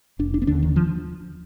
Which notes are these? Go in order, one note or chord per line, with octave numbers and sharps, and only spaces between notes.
F1 D4
D4
B3
D#2 D3 D4
D#3
F3